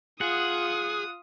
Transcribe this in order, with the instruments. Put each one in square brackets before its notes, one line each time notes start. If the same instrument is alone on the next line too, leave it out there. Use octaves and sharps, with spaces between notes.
[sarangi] F4 [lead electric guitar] G#4 [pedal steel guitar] F#5 [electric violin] D#6